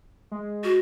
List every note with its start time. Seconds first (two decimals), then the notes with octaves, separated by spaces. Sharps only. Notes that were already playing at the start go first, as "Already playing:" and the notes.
0.31 G#3
0.64 F#4